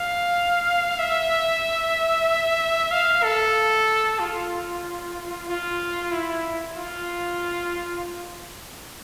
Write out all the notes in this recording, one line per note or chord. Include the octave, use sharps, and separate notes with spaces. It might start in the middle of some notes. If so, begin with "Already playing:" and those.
Already playing: F5
E5
F5
A4
F4
F4
E4
F4